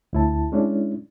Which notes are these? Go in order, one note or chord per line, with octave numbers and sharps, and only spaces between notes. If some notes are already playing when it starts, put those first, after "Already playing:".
D2 E4 A5
G#3 C#4 D4 E4